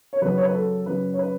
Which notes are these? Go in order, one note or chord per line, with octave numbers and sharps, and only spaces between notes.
C#5
F#2 C#3 F#3 B4
C#5
B4
A4
F#2 C#3 F#3 B4
C#5
B4